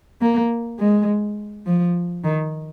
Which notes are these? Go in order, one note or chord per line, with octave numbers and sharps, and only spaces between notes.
A#3
G#3
F3
D#3